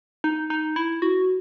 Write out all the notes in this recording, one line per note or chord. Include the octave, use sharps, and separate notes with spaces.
D#4
D#4
E4
F#4